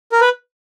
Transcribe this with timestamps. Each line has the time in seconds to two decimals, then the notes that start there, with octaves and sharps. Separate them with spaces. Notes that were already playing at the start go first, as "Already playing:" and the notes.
0.12 A#4
0.21 B4